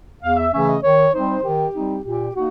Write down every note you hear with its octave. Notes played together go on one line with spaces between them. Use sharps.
E2 F5
E5
C#3 E3 A3 C#4 E5
D#5
D#3 C#5
G3 C4 D#4 C5
D#3 G4
G3 C4 D#4
A#2 G4
A#3 D#4 F#4